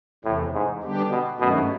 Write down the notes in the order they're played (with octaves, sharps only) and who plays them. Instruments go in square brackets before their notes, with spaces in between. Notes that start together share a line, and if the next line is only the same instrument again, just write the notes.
[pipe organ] E2 C3 E3 [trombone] A2
[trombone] G#2
[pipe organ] D3 G3 B3 D4 G4
[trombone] B2
[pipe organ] G2 D#3 F#3 A3 C#4 [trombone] B2